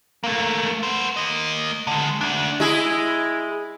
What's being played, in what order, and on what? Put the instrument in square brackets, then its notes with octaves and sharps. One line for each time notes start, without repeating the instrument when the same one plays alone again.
[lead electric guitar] A3 A#3
B3 C5
A#3 D#5
D3 G#3
D2 D4
[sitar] G#3 E4 G#4